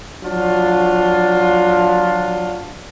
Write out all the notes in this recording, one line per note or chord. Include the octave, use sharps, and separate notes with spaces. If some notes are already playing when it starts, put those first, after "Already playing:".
F3 F#3 D4 F4